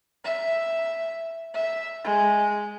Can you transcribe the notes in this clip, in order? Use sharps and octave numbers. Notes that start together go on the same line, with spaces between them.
E5
E5
G#3